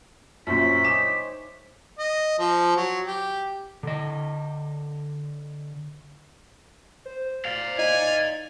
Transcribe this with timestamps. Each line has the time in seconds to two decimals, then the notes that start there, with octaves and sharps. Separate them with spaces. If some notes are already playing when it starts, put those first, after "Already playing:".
0.47 F#2 A#2 C5 C#5 E5 B6
0.84 D#4 G5 G#5 D6 E7
1.99 D#5
2.39 F3
2.76 F#3
3.06 G4
3.83 D3 D#5
7.06 C5
7.45 D5 F5
7.78 D#4 G#5